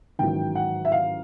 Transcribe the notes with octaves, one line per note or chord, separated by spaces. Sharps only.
A1 G#2 D#3 F#3 G5
F#5
E5
F5